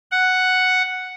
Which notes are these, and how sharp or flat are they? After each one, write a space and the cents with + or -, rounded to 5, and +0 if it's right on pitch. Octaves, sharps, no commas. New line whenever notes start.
F#5 +0